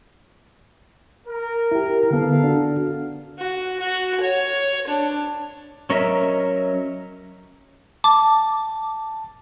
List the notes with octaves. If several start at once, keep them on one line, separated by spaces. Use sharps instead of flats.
A#4
E4 G4
D3 B3 A4 F5
D4 F#4
F#4
F#4
C#5
D4
F#3 C#4 A#4 D#5 E5
A5 D6